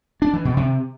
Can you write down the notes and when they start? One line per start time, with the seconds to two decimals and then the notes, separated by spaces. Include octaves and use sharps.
0.22 D4
0.33 E3
0.45 B2
0.57 C3